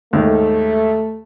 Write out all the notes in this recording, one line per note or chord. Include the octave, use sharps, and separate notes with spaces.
D#2 G#2 D#3 A3